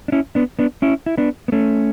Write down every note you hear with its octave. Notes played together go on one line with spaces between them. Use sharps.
D4
C#4 E4
B3 D4
B3 D4
C#4 E4
E4
B3 D4
B3
A3 C#4